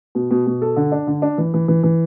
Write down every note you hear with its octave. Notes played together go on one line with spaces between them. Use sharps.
B2
B2
B2
A4
D3
D4
D3
D4
E3
E3
E3
E3